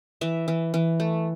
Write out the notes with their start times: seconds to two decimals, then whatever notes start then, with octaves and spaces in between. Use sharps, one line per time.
0.21 E3 E5
0.48 E3
0.74 E3
1.00 A3